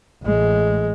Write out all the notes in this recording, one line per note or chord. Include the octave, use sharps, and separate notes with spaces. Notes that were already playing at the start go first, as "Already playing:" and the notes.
A1 G#3